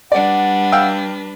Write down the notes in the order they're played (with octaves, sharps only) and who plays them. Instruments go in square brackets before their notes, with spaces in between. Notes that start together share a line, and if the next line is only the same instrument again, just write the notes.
[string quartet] G3 D4 B4 [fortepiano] D5 [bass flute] F#5
[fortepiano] F5 G5 E6